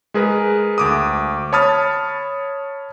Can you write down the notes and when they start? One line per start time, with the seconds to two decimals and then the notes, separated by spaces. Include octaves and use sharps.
0.14 G#3 G#4 A#4 B4
0.78 D2 D6 D#6
1.52 C#5 A5 B5 D#6 F6 A6